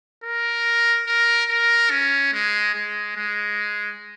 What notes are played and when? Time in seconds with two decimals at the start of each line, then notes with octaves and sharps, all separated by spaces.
0.24 A#4
1.07 A#4
1.49 A#4
1.90 C#4
2.32 G#3
2.74 G#3
3.16 G#3